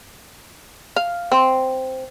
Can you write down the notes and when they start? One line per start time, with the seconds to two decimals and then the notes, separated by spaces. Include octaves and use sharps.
0.96 F5
1.32 C4